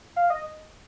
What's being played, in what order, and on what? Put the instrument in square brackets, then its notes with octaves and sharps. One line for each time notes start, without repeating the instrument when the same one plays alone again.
[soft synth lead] F5
D#5